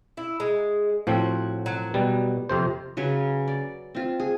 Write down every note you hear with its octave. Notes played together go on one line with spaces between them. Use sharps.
E4
G#3
A2 F3 C4 F#4
F#3
B2 G3
F2 C3 C5
C#3 F#3 B4 G#5
D5
C4 F4
G#4